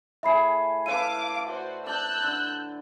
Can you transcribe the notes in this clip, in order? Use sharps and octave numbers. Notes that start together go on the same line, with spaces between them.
A2 G#4 E5 G#5 B5 C7
E4 A4 B4 F5 D6 D#7
F#4 C5 D5
D5 A5 E6 F#6 G6
D3